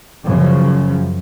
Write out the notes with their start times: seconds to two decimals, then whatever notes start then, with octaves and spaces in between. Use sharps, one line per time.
0.24 F#2 C#3 F3